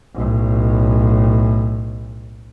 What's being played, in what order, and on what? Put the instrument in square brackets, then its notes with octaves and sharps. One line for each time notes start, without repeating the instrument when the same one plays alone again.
[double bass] B1 A2